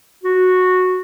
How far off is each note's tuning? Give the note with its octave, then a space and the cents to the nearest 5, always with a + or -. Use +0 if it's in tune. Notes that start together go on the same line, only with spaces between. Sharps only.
F#4 -10